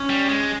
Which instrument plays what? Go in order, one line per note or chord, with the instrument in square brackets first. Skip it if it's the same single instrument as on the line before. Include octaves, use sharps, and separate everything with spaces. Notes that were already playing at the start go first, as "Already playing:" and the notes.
Already playing: [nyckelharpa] C#4
[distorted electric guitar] G3
G#3